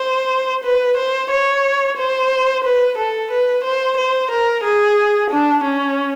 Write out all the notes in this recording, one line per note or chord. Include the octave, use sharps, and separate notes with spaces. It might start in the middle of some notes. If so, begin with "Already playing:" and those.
Already playing: C5
B4
C5
C#5
C5
B4
A4
B4
C5
C5
A#4
G#4
D4
C#4